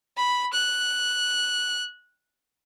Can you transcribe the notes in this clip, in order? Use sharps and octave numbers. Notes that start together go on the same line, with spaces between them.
B5
F#6